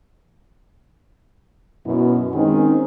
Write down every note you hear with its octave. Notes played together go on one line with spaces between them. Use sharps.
F#2 B2 B3 E4
D#3 G#3 C4 C#4 D#4 G#4